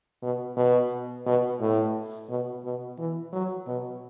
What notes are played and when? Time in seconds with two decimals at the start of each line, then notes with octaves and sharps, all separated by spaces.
0.22 B2
0.57 B2
1.26 B2
1.60 A2
2.29 B2
2.64 B2
2.98 E3
3.33 F#3
3.67 B2